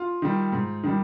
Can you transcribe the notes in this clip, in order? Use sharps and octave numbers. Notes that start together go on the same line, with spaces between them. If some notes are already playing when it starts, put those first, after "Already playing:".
Already playing: F4
D#3 G3
G#2
D#3 G3